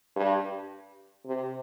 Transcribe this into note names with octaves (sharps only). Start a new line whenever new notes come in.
G2
C3